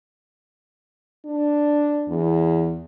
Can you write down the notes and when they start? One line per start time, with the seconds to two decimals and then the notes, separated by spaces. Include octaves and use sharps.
1.25 D4
2.09 E2